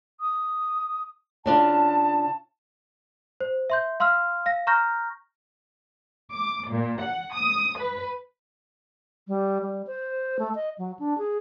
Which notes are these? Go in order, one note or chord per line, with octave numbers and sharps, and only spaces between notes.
D#6
C#3 D4 F4 A5
C5
E5 C6 G6
F5 C6 E6 F6
F5 A#6
A#5 C#6 F6 G6 A#6
D6
A#2
F#5
D#6
B4
G3
G3
C5
A3
D#5
F#3
D4
G#4